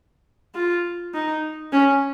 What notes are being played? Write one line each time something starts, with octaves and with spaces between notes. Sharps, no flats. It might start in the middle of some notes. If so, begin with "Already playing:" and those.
F4
D#4
C#4